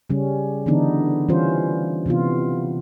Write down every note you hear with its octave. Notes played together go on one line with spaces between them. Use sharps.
C#3 G3 C#4
D3 E3 B3 D4 D#4
E3 G3 C#4 F4 C5
C3 E3 B3 F4